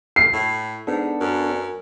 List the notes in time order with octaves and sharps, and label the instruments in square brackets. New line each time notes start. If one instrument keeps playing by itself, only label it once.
[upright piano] C7
[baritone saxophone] A2
[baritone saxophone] G#2 [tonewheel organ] B3 D4 A4
[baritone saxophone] F#2